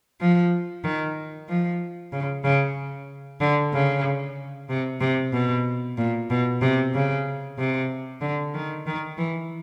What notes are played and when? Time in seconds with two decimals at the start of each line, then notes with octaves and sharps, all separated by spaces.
0.20 F3
0.84 D#3
1.49 F3
2.12 C#3
2.44 C#3
3.40 D3
3.73 C#3
4.69 C3
5.00 C3
5.33 B2
5.98 A#2
6.30 B2
6.61 C3
6.94 C#3
7.58 C3
8.21 D3
8.54 D#3
8.86 D#3
9.18 E3